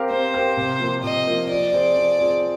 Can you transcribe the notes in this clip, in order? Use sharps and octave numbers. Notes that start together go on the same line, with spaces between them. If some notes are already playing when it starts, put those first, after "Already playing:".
Already playing: C4 G4 A#4 F5
C4 C5
G4 A#4 F5
C3
F3 A#3 F4 A#4
C3 D#5
F3 A#3 F4 A#4
F3 D5
C4 F4 G#4 C5
F3
C4 F4 G#4 C5